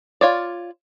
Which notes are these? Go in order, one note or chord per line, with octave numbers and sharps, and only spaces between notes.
F4 C#5 D5